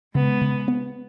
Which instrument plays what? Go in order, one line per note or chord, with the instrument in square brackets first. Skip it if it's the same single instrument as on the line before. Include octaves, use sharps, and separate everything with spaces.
[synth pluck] C#3 [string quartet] G#3 B3
[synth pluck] C#3
B3